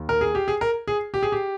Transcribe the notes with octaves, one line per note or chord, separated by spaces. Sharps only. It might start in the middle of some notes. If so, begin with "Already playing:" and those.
Already playing: D#2 D#3
A#4
G#4
G4
G#4
A#4
G#4
G4
G#4
G4